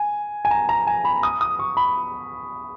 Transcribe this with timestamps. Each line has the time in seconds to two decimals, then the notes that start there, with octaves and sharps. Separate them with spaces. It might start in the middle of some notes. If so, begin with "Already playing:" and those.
Already playing: G#5
0.45 G#5
0.51 A#5
0.69 A#5
0.87 G#5
1.05 B5
1.23 D#6
1.41 D#6
1.59 C#6
1.77 B5